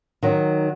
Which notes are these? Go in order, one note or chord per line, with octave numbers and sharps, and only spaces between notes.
D#3 F#3